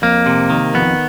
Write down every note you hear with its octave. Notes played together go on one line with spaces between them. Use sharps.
F2 A#3
C3
D#3
F2 B3